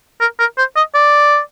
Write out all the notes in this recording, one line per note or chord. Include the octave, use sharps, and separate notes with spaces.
A#4
A#4
C5
D#5
D5